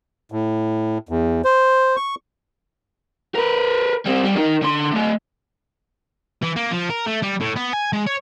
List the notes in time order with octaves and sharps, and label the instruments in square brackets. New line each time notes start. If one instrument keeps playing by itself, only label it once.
[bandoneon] A2
E2
C5
C#6
[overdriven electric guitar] A#4 B4
G3 C4
G3
D#4 A#4
D3 C6
A3 D#5
[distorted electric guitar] E3
A#3
F3
A#4
A3
G3
A2
B3
G#5
G#3
C#5